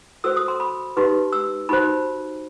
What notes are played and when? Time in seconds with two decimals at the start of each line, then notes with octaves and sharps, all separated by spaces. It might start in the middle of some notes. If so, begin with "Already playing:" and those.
0.24 F#4 A4 C5 E6
0.36 D#6
0.48 C6
0.60 B5
0.97 D#4 G4 B4 C6
1.33 E6
1.69 D#4 F#4 C5 B5